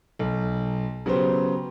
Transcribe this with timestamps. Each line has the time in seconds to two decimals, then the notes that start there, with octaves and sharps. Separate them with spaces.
0.19 B1
1.06 C#3 F#3 B3 G4 C5